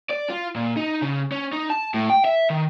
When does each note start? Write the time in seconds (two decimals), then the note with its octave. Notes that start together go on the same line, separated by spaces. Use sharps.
0.09 D5
0.30 F4
0.56 A#2
0.77 D#4
1.02 C#3
1.32 C#4
1.53 D#4
1.70 A5
1.94 A2
2.10 G5
2.25 E5
2.50 D#3